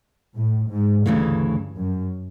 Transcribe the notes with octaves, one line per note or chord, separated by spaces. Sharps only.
A2
G#2
D2 G2 C#3 E3 A3
F#2